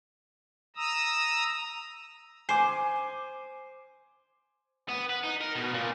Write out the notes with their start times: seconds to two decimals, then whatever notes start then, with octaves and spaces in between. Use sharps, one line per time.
0.76 A#5 D#6 E6
2.49 C5 G#5 D6
4.89 B3
5.10 B4
5.24 D#4
5.41 A#4
5.55 B2
5.74 A#2